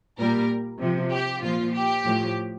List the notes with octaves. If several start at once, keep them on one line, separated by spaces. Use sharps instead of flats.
A#2 G3 A#4
C3 F3
G4
A#2 F3 F4
G4
A2 F3